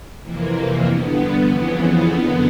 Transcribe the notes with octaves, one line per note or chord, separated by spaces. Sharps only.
F2 C3 E3 A#3
G2 D3 B3
F2 C#3 E3
F#2 D3 B3